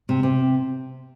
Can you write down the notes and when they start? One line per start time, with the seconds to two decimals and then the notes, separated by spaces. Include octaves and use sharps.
0.09 C3
0.23 C3